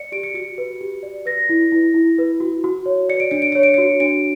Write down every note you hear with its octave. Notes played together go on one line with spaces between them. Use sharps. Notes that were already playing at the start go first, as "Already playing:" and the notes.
Already playing: D5 C#7
G4 D7
C#7
F#4 C#7
B4
G4
D5
B4 A#6
E4
E4
E4
B4
F#4
F#4
C#5
D5 C#7
D7
D4 C#7
D7
C#5 C#7
D7
F#4 C#7
D4 D7